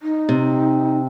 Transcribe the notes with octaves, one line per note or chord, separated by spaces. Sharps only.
D#4
C3